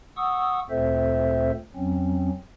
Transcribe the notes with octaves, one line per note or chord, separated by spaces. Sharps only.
F#5 C#6 D#6 E6
D2 A#2 C4 A4 C5 E5
F2 F#3 C4 C#4